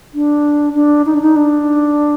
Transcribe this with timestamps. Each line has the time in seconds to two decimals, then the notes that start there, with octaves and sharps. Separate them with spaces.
0.14 D4
0.75 D4
1.06 D#4
1.14 D4
1.22 D#4
1.36 D4